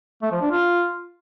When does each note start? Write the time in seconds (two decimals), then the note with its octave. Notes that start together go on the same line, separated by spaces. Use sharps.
0.22 A3
0.32 F3
0.41 D4
0.51 F4